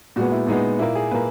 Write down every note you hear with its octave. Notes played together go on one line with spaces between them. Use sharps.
A#2 G#3 B3 F#4
E4
A#2 G#3 B3 D#4
A#2 A#3 E4
G#4
A#2 A#3 B4